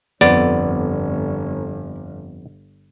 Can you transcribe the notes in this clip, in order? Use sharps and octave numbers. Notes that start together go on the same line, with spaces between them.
G1 F2 B3 D5